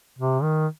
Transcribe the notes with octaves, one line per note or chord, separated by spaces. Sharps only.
C3
D#3